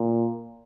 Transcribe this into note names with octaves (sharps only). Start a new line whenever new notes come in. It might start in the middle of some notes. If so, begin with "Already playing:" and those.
Already playing: A#2